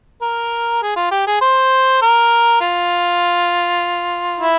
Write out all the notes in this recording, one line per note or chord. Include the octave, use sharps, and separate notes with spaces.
A#4
G#4
F4
G4
G#4
C5
A#4
F4
E4